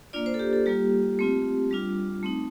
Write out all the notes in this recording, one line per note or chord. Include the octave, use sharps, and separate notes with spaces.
A#3 D4 F4 D5
C5
A4
G4
A4
G3 A#3 F4 G4
A3 C4 F4
G3 D4 F4
A3 C4 D#4